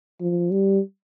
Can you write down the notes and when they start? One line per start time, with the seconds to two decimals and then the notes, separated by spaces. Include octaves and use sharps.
0.21 F3
0.51 G3